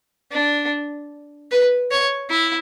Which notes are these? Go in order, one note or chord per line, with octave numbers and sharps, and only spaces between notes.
D4
B4
C#5
E4